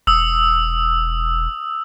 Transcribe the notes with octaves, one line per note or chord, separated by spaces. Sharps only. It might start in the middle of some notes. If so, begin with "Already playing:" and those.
E1 D#6 E6